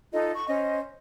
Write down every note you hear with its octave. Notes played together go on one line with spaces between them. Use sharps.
D#4 F4 A4 D#5
C#6
C#4 C5 D#5